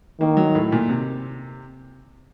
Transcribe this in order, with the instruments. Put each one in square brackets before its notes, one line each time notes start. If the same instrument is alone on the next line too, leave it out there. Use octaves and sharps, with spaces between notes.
[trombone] D#3 [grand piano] A#3
[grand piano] F#3
A2
A#2
C3